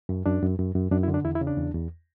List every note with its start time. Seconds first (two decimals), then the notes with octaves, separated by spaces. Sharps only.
0.09 F#2
0.26 F#2 D4
0.42 F#2
0.58 F#2
0.75 F#2
0.91 F#2 D4
1.03 E4
1.08 D3
1.14 D4
1.24 E2 E4
1.35 E4
1.41 C#3
1.47 D4
1.57 E2
1.74 E2